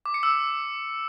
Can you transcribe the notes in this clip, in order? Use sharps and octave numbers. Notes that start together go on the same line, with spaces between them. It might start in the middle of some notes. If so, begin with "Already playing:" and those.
D6
C#7
E6